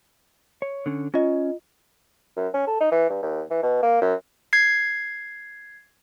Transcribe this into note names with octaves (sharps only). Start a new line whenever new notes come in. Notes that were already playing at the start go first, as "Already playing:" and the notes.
C#5
D3 C#4
C#4 F4 D#5
F#2
C#4
A4
D#4
E3
G2
D#2
E3
B2
A#3
F#2
G#6 C7